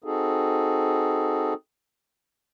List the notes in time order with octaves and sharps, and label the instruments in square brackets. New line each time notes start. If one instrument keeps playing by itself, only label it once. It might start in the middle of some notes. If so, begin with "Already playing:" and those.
[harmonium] C4 D#4 F#4 G#4 A4